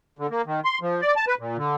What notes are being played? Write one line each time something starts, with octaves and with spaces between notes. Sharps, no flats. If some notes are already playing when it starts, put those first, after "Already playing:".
D3
A#3
D#3
C6
F3
D5
A5
B4
A#2
D3